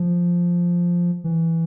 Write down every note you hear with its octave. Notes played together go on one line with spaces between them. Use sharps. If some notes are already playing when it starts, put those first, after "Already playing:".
Already playing: F3
E3